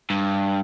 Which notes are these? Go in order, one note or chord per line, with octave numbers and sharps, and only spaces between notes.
G2